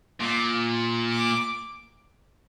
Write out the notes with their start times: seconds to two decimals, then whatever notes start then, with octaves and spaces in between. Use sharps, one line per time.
0.20 A#2 D6
1.12 D6